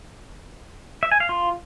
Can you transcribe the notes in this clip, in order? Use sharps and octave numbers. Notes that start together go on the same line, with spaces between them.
E5
G#5
F5
F4